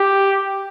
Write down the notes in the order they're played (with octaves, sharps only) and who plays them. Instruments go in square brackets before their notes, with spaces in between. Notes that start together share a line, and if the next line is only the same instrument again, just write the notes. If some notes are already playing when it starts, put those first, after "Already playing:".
Already playing: [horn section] G4